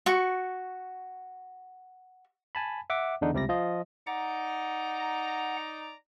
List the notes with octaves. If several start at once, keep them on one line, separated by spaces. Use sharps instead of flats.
F#4 C#6
G#5 A5 B5
E5 F#5 D6
E2 D3 D4 D#4
C#2 C3 G3 D5 A#6
F3 F4 D#5
D#4 D5 F#5 A#5